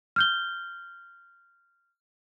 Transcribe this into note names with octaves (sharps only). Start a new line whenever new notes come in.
F6 G6 G7